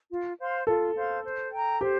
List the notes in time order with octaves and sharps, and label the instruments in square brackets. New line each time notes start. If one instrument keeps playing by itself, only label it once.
[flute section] F4
C5 F5 C6
[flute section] F4 [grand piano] A4
[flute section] C5 F5 C6
C5
G5 A#5
[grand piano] G4 [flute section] C5